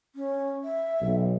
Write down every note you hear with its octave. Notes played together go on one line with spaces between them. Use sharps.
C#4
E5
B1